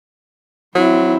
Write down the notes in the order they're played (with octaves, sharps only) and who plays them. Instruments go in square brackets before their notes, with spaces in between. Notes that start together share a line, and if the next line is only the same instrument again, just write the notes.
[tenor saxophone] F#3 [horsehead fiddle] C4 E4